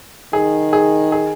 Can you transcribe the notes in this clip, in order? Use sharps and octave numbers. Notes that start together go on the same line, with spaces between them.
D#3 G#4
G#4
G#4